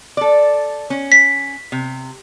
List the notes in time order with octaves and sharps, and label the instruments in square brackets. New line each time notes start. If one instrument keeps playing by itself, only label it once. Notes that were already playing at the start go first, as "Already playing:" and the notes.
[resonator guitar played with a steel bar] A4 D5
C#4
[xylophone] B6
[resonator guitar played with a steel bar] C3